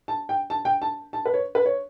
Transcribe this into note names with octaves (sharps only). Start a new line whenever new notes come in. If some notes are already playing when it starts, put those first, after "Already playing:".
A5
G5
A5
G5
A5
A5
B4
C#5
B4
C#5